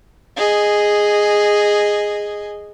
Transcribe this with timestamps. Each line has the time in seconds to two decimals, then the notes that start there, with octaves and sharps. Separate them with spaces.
0.37 G#4 D#5